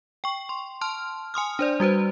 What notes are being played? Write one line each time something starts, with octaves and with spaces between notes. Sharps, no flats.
G5 C#6
C6
A5 C6 F6
G#5 C6 D#6 F6
D4 C5 D5
G3 F#4 B4 C5